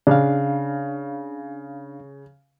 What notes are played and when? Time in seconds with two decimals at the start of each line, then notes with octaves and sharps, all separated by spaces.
0.07 C#3 D4 F5